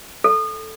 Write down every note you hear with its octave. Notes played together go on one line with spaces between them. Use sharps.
A4